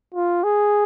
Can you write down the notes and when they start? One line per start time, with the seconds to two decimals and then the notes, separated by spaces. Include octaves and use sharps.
0.14 F4
0.43 G#4